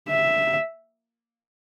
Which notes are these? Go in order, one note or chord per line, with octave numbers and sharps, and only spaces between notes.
E5